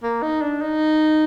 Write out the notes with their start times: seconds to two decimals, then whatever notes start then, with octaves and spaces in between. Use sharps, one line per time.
0.03 A#3
0.22 D#4
0.42 D4
0.62 D#4